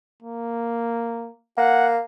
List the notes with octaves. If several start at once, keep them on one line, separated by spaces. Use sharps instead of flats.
A#3
A#3 F#5